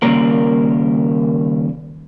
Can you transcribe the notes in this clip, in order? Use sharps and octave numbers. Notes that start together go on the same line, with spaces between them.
D#2 C#3 F#3 G3 A#3 A#4